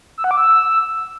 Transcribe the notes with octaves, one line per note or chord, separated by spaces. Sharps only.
E6
F#5
D6
E6